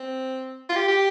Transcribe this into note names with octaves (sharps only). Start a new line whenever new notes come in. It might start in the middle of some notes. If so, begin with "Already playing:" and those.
Already playing: C4
F4
G4
G4